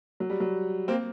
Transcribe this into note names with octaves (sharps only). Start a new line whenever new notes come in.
F#3
G3
F#3
A#3 C4